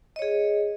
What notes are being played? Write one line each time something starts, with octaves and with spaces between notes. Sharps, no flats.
G#4 C#5 D#5